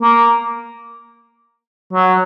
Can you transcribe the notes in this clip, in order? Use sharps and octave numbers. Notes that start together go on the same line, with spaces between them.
A#3
F#3